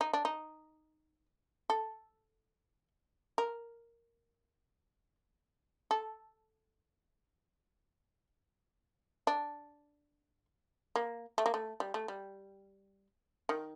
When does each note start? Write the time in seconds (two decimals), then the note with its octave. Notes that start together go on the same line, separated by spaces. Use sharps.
0.01 D#4
0.13 D4
0.25 D#4
1.70 A4
3.38 A#4
5.91 A4
9.27 D4
10.96 A#3
11.38 A3
11.46 A#3
11.54 A3
11.80 G3
11.94 A3
12.08 G3
13.49 D#3